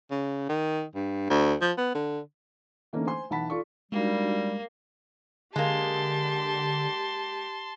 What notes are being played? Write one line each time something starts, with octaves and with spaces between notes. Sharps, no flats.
C#3
D#3
G2
D2
F3
B3
D3
D3 E3 A3 A#3 C#4 D#4
C5 G#5 C6
B1 E3 F#5 A5 B5 B6
F4 A4 D5 C#6
G3 G#3 A#3 D4 D#4 F#4
D3 G#3 A#3 G4 A5 C6